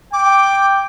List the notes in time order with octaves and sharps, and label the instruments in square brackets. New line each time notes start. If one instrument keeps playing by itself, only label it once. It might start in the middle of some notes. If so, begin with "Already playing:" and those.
[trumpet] G5 [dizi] D6